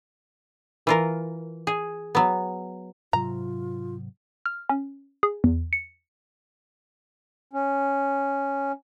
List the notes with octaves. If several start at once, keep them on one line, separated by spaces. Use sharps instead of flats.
E3 F4 A#4
G#4
F#3 B3
G#2 C3 F#3 F4 A#5
F6
C#4
G#4
E2
C#7
C#4